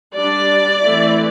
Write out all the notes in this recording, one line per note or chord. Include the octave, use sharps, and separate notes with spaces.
G3 D4 D5
E3 A3 C4 E4